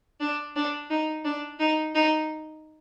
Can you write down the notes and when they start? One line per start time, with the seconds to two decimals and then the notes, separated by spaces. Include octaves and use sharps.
0.20 D4
0.55 D4
0.89 D#4
1.24 D4
1.59 D#4
1.94 D#4